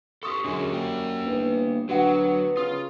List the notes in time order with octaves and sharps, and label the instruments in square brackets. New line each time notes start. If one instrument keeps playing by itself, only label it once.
[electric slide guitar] G4 A4 [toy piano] C6 C#6 D#6
[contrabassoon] F#2 [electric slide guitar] D3 F#4 A4 [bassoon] G#3
[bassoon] G3 [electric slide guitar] A#3 G5
[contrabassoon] G1 [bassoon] E3
[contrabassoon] D2 [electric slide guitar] F#3 [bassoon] B3 [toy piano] F#4 F#5 G5
[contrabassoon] C#3 [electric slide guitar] F4 [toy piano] D#6